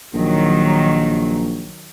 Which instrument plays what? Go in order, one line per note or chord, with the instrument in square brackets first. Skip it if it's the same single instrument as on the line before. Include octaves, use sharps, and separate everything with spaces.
[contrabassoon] A#1 [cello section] D#3 F#3